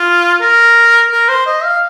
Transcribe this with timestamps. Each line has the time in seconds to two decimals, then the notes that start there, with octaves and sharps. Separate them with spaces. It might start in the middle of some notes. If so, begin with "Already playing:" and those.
Already playing: F4
0.41 A#4
1.11 A#4
1.29 C5
1.46 D#5
1.64 F5